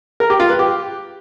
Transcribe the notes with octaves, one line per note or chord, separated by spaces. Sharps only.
A#4
G4
F4
B4
G4